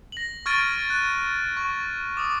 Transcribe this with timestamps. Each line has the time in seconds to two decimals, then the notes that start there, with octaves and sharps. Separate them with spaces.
0.12 A#6 F#7
0.46 C#6 F6 G#6 A6 D7 D#7
0.90 F#6 D#7
1.57 C#6
2.17 D6 D#6